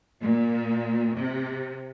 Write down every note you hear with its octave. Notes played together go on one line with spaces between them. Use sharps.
A#2
C3